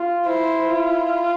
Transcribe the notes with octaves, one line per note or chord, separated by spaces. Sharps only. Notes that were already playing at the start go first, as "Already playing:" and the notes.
Already playing: F4
E4 C5
F4